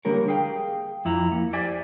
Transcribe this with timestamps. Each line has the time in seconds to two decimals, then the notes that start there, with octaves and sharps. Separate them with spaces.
0.05 D3 G3 A#3 A#4 C#5
0.28 G#4 F5 G5
1.05 F2 E4 A#5
1.32 A#3
1.53 G4 C5 D5 E5 G#5